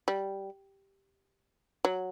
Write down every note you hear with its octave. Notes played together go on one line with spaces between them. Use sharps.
G3
F#3